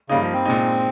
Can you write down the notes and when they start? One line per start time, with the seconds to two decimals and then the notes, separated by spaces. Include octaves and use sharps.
0.09 G2 C#3 G3 A#3 D#4
0.21 F3
0.33 C4
0.46 A#2 G#3 D#4